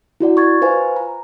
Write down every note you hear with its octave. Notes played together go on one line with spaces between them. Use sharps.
E4 F#4 D5 F#5
C#6 G#6 A6
F4 B4 C5 F5 G#5
A#5